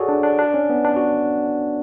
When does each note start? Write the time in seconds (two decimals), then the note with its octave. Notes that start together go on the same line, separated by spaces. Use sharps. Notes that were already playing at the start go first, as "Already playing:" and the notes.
Already playing: F#4 G#4 A4 C#5 D5
0.09 D4
0.23 D4
0.39 D4
0.54 C#4
0.70 B3
0.85 D4
0.96 F#4